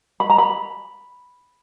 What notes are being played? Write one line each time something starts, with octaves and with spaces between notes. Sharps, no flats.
B5
A#5
B5